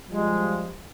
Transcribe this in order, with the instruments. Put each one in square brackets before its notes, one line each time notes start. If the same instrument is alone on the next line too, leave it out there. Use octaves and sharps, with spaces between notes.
[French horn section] F3 G3 [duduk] G#3